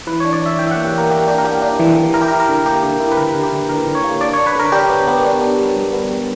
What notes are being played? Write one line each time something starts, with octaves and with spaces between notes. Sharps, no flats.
E3 B4
C#5
D4
D5
D4 E5
E3 G5
E5
F#5
A#3
G4
A#3 A#4
A#3 G4
D4 G4
A#4
A#3 G4
D4
E3
E3
E4 A#4
G4
A#4
E4
A#4
D3
A#3 G4
D3
E4
B4
D3 A#4
D3
G4
D3
D3 A#4
D3
C#5
A#3
D4 D5
C#5
D4
B4
D3 A#4
D4 G4
B3
B3
D4
D4
G3
G3
B3
G3